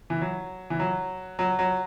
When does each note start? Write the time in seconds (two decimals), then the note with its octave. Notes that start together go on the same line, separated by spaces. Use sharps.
0.10 E3
0.21 F#3
0.70 E3
0.80 F#3
1.39 F#3
1.59 F#3